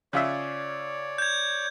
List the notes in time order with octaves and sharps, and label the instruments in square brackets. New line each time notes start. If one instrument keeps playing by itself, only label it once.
[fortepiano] C#3 F4 E5 [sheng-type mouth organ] C#5 D5
[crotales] G6 G#6